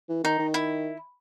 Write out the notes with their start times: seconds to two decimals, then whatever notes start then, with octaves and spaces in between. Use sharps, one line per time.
0.09 E3
0.24 D#3 D#4
0.39 D#3
0.54 E4